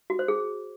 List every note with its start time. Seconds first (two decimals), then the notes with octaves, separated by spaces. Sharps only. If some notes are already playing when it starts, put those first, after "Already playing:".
0.10 F#4
0.19 C5
0.28 G#4